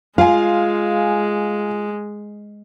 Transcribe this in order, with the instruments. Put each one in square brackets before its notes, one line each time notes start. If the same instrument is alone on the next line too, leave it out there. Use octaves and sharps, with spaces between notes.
[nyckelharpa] G#3 [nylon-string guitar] F4 [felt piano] F5 G#5